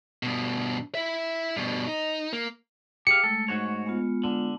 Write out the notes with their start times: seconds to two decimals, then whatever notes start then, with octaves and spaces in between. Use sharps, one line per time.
0.23 G2 B2
0.95 E4 E5
1.56 G2 B2
1.88 D#4
2.33 A#3
3.07 G4 G#4 F5 G5 C#7
3.24 G#3 A3 A4
3.48 G#2 F#4 C#5
3.86 G#3 B3 F4
4.24 D3